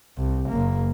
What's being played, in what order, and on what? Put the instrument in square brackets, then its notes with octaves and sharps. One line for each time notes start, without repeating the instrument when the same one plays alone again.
[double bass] C2
F#1 A#3